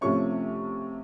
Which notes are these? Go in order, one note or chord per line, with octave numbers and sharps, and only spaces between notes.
C3 F3 A3 C#4 C#6